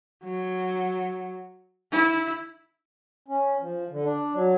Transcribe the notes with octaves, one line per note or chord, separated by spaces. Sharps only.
F#3
E4
C#4
F3
D3
D4
F#3